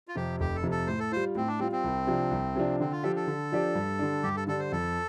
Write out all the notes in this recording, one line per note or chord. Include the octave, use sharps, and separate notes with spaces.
F4
F2 C3 G4
F1 G4
A4
F2 C3
A4
A2 C5
A4
G3 F4 C5
A2 C4
D4
G3 C4 F4
C4
C2
C3 F3 D4
C2
C3 F3 D4
D3 C4
F4
F3 D4 G4 A4 D5
A4
D3
F3 D4 G4 D5
G2
D3 G3 D4
G2 G4
A4
D3 G3 D4 A4
C5
F2 A4